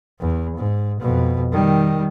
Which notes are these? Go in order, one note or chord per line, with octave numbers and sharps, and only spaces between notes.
E2
G#2
F2 B2
D#3 G3